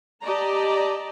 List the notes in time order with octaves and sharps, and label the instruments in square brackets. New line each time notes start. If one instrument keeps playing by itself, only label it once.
[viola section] G4 D5 D#5 A5 A#5